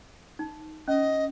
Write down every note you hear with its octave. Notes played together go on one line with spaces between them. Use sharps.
D#4
C#4 D#5